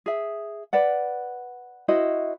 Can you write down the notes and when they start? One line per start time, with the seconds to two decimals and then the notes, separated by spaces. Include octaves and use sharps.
0.06 G#4 E5
0.73 B4 D5 F#5
1.88 E4 F#4 C5 D#5